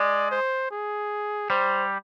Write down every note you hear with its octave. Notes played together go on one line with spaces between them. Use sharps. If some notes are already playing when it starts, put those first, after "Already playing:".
Already playing: G#3 D5
C5
G#4
G3 C5